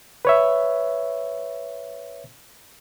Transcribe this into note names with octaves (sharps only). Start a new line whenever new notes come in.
B4 C#5 E5